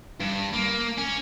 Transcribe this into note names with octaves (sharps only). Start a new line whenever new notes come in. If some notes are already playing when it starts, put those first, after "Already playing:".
G2
A#3
C#4